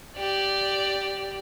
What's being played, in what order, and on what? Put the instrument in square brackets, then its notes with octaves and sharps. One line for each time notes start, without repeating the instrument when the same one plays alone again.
[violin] G4 D5